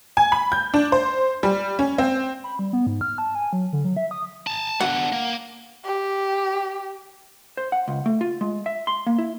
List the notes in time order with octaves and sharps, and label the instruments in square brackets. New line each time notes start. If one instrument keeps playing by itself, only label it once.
[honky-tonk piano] G#5
B5
G6
D4
C5
G3
C#4
C4
[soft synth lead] B5
G3
B3
G#2
F6
A5
G#5
F#3
D3
F#3
E5
D#6
[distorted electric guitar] A5 A#5
[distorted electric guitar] B3 D4 [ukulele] F#5
[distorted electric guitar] A#3
[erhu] G4
[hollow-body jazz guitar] C5
F#5
C#2
A3
F4
G#3
E5
C6
A#3
E4